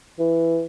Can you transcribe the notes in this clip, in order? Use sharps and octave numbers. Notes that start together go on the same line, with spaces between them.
E3